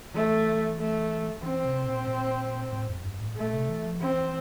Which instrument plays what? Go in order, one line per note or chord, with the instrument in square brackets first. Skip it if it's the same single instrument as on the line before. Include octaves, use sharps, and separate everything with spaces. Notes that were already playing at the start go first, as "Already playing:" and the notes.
[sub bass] E3 [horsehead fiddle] A3
[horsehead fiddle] A3
[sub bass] E3 [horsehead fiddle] C4
[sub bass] C3
A#2
A#2
A2
F2
G2
A2
[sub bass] A#2 [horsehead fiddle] A3
[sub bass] C3
E3
F3
[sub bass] E3 [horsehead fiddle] C4